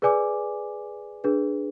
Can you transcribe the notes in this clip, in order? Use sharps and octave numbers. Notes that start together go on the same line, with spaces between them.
G#4 B4 D5 G#5 D6
D4 G#4 B4